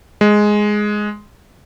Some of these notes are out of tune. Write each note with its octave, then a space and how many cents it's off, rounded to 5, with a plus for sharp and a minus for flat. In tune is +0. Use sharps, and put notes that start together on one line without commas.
G#3 +5